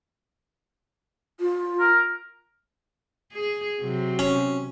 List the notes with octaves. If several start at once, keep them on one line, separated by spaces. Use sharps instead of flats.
F4
A#4
G#4
C3 F#3
C#4